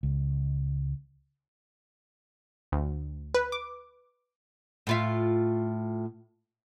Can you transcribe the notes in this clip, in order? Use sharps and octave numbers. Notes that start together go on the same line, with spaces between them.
C#2
D2
B4
D6
A2 F4 E5